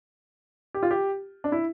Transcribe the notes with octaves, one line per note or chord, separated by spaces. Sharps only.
G4
F4
G4
D4
E4